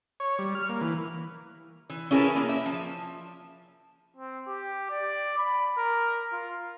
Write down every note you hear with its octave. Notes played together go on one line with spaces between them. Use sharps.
C#5
G3
F6
A#3
E3
E3
C#4 E4 G#4 A#4 B4 A5
A#3
E5
F3
C4
G4
D5
B5
A#4
F4